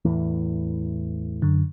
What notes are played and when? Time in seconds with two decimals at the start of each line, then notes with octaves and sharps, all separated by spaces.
0.05 E2 A2 E3
1.42 F#2 D3